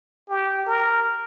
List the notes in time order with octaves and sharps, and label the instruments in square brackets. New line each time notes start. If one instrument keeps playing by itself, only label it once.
[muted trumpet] G4
A#4